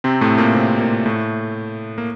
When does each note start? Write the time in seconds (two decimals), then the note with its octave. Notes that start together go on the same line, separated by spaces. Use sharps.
0.04 C3 C4
0.21 A2 A3
0.38 A#2 A#3
0.55 C3 C4
0.80 A#2 A#3
1.06 A2 A3
1.98 A#3